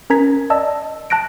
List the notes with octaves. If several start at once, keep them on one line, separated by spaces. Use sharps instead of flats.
C#4 A#4 A#5 G#6 B6
D5 D#5 A5 E6
A5 F#6 A#6 D7